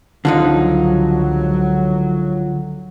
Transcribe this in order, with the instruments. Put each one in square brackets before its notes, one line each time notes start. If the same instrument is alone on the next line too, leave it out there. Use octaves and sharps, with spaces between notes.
[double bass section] C#2 F#3 [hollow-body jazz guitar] D3 F3 D#4